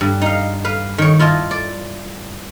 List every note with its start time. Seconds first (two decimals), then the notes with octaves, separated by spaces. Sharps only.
0.01 G2
0.22 D#4 F5
0.65 B4 F5
0.98 D#3 C#5
1.19 E4 F4 D#5 A5
1.51 D5